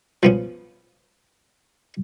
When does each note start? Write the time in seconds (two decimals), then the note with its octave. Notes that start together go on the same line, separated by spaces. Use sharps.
0.23 F3 B3 C#4